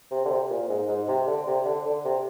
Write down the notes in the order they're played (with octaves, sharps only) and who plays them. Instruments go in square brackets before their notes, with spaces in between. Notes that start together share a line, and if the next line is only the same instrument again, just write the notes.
[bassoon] C3
D3
C3
A#2
G#2
G#2
C3
D3
C3
D3
D3
C3